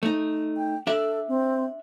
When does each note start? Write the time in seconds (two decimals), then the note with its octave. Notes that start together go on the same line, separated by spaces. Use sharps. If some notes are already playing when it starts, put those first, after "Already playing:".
0.03 A3 D#4
0.57 G5
0.87 D4 A4 D5 E5
1.28 C4